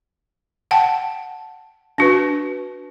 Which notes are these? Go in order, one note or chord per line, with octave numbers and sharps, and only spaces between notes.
F#5 G5 A5
D4 F#4 B4